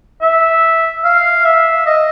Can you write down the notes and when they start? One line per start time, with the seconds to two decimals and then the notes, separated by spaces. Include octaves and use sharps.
0.22 E5
1.04 F5
1.44 E5
1.86 D#5